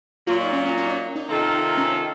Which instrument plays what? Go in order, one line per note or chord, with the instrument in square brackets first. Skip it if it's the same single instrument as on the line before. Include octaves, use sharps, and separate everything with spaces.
[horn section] A#2 F#3 A#3 [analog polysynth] F4
[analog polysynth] D#4
C#4
C#4
C#4
D#4
C#4
D#4
[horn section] C3 D#3 A#3 F4 A4
[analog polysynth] C#4